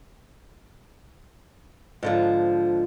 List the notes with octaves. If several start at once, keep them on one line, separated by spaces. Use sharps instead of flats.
G#2 D3 F3